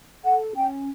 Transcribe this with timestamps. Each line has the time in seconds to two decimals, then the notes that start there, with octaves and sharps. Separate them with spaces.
0.24 A4 F#5
0.55 C#4 G5